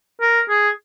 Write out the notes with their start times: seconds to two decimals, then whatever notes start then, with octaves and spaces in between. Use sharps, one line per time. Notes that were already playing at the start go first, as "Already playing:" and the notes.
0.21 A#4
0.49 G#4